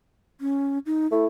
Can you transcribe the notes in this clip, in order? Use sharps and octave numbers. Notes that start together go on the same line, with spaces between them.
C#4
D#4
A3 E4